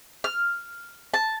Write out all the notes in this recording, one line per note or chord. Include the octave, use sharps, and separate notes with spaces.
F6
A5